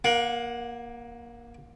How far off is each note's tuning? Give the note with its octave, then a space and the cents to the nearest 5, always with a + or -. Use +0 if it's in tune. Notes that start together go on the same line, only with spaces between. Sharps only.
A#3 +15 F#5 -15